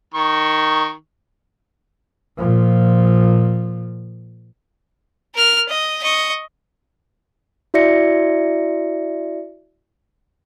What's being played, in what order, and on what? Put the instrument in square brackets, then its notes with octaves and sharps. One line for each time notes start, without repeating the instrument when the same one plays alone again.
[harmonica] D#3 C#6
[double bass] A#2 F3
[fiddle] A#4 F6
D#5
D#5 C#6
[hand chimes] E4 F#4 D5 E5 A#6 C#7